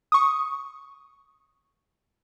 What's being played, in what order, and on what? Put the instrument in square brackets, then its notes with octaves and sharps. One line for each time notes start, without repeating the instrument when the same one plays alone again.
[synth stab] C#6 D#6